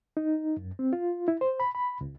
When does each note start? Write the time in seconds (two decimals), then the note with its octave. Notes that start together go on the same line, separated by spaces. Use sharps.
0.17 D#4
0.57 F#2
0.79 C4
0.93 F4
1.28 E4
1.41 C5
1.60 B5
1.75 B5
2.01 C#2